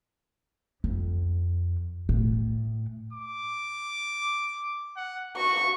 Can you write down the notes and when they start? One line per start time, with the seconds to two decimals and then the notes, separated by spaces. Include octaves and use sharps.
0.84 F2
2.09 A2
3.13 D6
4.97 F#5
5.37 F#4 C#6